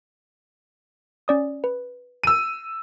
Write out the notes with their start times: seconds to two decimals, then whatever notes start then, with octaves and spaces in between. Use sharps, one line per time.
1.28 C#4 D5 D#6
1.64 B4
2.24 E6 D#7